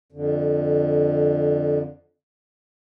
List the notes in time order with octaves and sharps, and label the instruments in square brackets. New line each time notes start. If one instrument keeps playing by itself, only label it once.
[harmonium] F2 D3